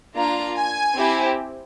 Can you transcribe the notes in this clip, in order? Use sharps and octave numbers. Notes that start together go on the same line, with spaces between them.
A#3 D4 F4 A#5
G#5
C4 E4 G4